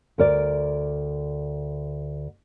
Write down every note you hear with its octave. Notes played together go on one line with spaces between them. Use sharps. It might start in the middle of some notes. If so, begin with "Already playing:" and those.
D2 A#4 D5